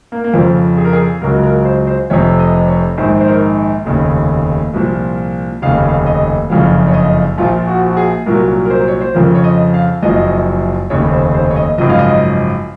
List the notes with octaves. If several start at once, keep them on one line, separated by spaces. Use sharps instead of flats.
A#3
A#3
F2 C#3 F3 C4
G#4
A#4
G#4
C#2 C#3 F#3 A#4
A#4
C5
C5
F1 F2 C3 C#5
D#5
C#5
A#1 G#2 D#3 C5
C5
A#4
F1 D#2 C#3
C2 A#2 F3
F1 D#2 C#3 F5
F5
D#5
F#1 F2 C#3 F3 F5
C#5
D#5
A#1 A#2 F3 F4
F#4
F#4
G#4
C2 A#2 F#3 A#4
A#4
C5
C#5
C5
F2 C#3 F3 A#4
C#5
D#5
F5
F#1 F#2 F3 D#5
F1 D#2 C#3 C#5
C5
C5
C#5
D#5
G#1 F#2 C#3 F3 D#5
F5
D#5